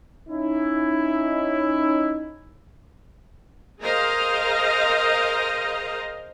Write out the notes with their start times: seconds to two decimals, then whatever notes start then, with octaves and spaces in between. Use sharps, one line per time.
0.28 C#4 D#4 E4
3.81 G#4 A#4 C5 D#5 F5 A#5